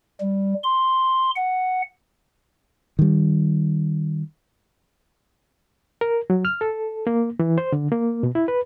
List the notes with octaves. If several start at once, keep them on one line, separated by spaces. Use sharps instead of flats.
G3
C6
F#5
D#3 G3
A#4
F#3
F6
A4
A#3
E3
C5
D3
A#3
B2
E4
B4